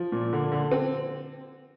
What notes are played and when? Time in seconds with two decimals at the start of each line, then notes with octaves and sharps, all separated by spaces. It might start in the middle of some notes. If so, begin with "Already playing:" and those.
Already playing: F3
0.12 A#2
0.33 D3
0.52 D3
0.71 C4